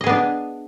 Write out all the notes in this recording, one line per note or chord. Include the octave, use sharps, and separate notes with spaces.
B3 D4 G#4 D#5